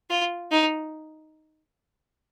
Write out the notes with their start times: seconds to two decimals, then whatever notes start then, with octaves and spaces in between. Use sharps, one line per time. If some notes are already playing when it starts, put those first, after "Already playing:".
0.10 F4
0.51 D#4